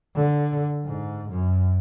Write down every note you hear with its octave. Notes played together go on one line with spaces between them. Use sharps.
D3
G#2
F#2